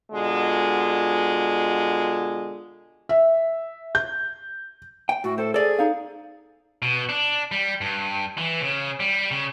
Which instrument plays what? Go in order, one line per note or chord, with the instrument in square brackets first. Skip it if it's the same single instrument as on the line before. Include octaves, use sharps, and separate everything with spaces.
[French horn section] B2 D3 G#3 F4
[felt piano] E5
G6
[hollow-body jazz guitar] G5
[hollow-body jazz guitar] A2 [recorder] F#4
[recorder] A4 [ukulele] C5
[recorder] G#4 [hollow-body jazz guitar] A4 D5
[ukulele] D#4 F5
[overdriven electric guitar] B2
D4
G3
G2
E3
C#3
G3
C#3